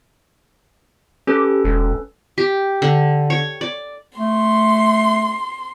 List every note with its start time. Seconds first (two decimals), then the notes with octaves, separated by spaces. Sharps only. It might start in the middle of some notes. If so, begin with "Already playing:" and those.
1.27 C#4 G4 A4 B4
1.65 E1
2.38 G4
2.82 D3
3.30 C#5
3.61 D5
4.18 A3 C6